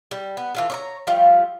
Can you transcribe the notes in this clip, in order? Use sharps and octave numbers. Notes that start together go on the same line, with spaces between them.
G3
B3
E3 F4 A4
C#5 D5 A#5
F3 G3 A3 F4